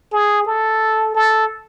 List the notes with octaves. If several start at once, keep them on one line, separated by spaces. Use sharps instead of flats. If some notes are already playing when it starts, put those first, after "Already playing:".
G#4
A4
A4